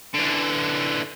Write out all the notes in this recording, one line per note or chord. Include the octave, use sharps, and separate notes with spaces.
D3 E3